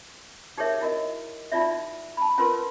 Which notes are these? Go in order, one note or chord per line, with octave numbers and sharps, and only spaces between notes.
D#4 G4 G#4 A#4 C#5 E5
E4 F#4 A#4 D#5
D#4 F4 F#4 D5 E5
A5 B5
C#4 F4 A#4 B4 C6